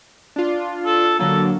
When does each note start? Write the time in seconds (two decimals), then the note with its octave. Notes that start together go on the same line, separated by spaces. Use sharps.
0.36 D4 F4
0.86 A4
1.19 D3 F#3 A#3 A4